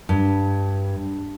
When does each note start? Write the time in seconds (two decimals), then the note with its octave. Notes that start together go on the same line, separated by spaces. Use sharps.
0.09 G2